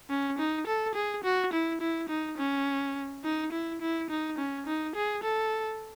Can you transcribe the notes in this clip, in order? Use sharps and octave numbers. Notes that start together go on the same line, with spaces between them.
C#4
D#4
A4
G#4
F#4
E4
E4
D#4
C#4
D#4
E4
E4
D#4
C#4
D#4
G#4
A4